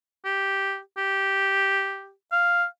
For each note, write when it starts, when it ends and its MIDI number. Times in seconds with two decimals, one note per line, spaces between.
0.25 0.79 67
0.97 2.12 67
2.32 2.65 77